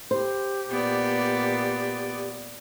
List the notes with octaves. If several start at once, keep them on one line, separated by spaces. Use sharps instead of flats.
G4 C5
A#2 B3 D5